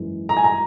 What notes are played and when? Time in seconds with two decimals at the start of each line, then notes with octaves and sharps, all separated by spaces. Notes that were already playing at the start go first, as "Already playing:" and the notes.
Already playing: G#1 F#2 E3 G#3
0.29 A#5
0.37 G#5
0.44 A#5